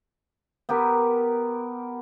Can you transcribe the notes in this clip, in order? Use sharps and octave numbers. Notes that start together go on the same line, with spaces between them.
B3 G4 A#4